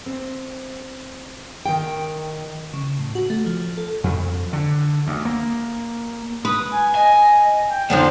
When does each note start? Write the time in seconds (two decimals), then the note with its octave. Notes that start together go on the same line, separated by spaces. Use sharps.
0.06 C4
1.66 D#3 G5
2.73 C#3
2.99 A2
3.15 F#4
3.30 A3
3.46 F3
3.77 A4
4.04 F2
4.53 D3
5.07 D2
5.25 A#3
6.45 B4 D#6
6.71 G#5
6.95 D#5 G#5
7.69 G5
7.90 F2 D3 F3 B3 D#4